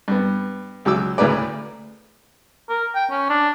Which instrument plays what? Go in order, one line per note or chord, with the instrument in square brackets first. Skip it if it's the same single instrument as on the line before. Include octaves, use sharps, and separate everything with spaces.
[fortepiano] G2 B3
C#2 F#3 D6 E6
D2 A2 C#3 A#4 B4 D5
[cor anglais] A#4
G5
C#4
D4